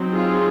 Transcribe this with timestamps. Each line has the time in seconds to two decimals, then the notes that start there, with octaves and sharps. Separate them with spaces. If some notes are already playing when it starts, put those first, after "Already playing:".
Already playing: F#3 C4 D#4
0.13 F4 G#4